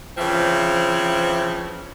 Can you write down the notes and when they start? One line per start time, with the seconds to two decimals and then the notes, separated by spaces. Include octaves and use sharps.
0.17 C#3 E3 F3 C4